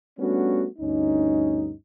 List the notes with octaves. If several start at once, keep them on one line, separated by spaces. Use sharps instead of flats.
G3 A3 B3 C#4 D4 F#4
D2 G2 C#4 D#4